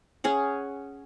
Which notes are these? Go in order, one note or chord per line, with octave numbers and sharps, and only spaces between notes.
C#4 G#4 F#5